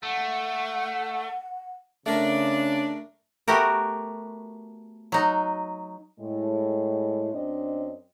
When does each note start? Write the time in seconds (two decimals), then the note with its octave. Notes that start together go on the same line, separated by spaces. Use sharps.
0.03 A3 F#5
2.06 C#3 A3 D4 A#4
3.48 A3 B3 F#4 G4 A#4
5.12 F#3 D#4
6.20 A2 G#3
7.34 F#2 C4 D4 D#5